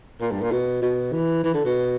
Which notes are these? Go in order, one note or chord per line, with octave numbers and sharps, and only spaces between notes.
A#2
G2
A#2
B2
B2
E3
E3
D3
B2